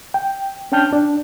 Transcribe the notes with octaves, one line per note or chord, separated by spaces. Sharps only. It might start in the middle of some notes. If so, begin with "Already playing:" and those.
G5
C#4 D4 G5 A5 F6 G6
D4